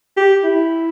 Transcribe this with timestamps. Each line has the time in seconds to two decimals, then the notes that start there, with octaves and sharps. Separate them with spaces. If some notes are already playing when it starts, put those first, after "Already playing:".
0.17 G4
0.44 E4